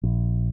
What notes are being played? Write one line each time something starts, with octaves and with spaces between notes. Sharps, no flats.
A#1